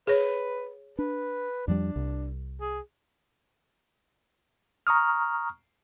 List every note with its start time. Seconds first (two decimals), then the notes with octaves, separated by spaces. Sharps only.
0.07 G#4 B4 C#5
0.99 D4 B4
1.68 F2 F3 G3 D4
1.96 C2
2.61 G#4
4.87 A#5 C#6 D#6 F6